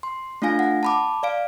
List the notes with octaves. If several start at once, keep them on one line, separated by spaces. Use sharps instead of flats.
C6
A3 D4 F4 F5 G#5 A#6
F#5
A5 B5 D6
D5 F5 D7